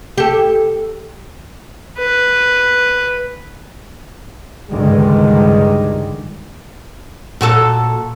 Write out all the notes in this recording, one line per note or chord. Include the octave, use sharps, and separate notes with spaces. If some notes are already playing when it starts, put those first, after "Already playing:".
G4 A4
B4
C#2 G2 D3 D#3 G#3
A#2 F#4 A4